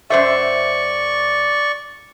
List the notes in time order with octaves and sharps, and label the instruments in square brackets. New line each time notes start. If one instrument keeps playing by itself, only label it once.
[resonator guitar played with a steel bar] F#2 C5 E5 [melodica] D5 C#6